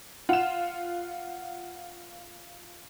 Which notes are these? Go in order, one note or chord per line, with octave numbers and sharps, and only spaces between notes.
F4 F#5 E7